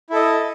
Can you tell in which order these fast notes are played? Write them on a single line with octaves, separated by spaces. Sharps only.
E4 A4 D#5